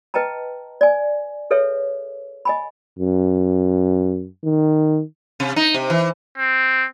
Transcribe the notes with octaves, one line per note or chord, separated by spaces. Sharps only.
B4 D#5 G5 A5 A#5
D5 G#5
G#4 A4 B4 C#5 E5
D#5 G#5 B5
F#2
D#3
C3
D#4
C3
E3
C4